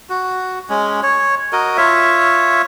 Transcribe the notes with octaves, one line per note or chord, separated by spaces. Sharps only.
F#4
G#3 C#4
C#5
F#4 A#4 D#5
F4 C#5 E5